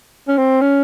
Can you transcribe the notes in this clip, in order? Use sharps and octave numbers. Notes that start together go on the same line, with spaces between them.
C#4
C4
C#4